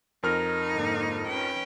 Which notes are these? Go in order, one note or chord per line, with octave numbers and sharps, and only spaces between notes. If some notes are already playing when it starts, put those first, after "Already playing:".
F2 D#4 A#4 F6
G#2 D3 A#3
C#4 B4 G5